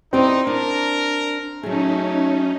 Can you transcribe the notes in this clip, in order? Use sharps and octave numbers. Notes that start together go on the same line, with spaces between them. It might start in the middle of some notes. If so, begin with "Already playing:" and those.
C4 D#4 E4 D5 G5
D4 A#4
F#3 A3 C#4 D#4 G#4